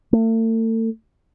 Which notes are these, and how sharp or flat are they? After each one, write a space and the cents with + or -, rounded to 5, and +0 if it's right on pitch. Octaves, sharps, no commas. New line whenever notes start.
A3 +40